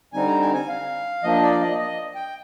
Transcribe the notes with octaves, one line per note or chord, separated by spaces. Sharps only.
D3 G3 C4 D#4 G#5
A#5
G#5
G#5
F5
F3 A#3 D4 D#5
D5
D#5
D#5
G5